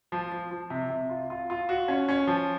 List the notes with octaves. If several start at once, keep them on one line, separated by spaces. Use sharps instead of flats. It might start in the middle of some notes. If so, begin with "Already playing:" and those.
F3
F3
F3
C3
C3
F4
F4
F4
F#4
C#4
C#4
F3